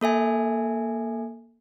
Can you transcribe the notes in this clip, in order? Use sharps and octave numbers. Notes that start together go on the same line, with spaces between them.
A#3 A4 E5 G#5